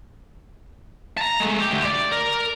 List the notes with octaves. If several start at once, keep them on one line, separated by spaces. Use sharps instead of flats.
A5 A#5
G#3 A3
G4
D2
D5
A#4